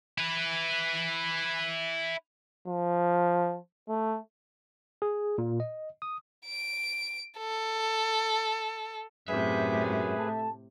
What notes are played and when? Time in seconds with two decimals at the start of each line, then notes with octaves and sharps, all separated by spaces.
0.18 E4 B4
2.68 F3
3.89 A3
5.02 G#4
5.38 A#2
5.60 D#5
6.02 D#6
6.46 D7
7.38 A4
9.28 F#2 A2 C3 G#4 B4 E5
10.19 A3 A5